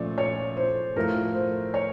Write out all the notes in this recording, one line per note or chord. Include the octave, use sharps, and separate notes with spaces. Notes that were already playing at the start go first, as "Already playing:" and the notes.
Already playing: A#2 F3 A3 C#4 D5
C#5
C5
A2 F3 A3 A#4
C5
C#5